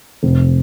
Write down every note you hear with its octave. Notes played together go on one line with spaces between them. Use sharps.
F1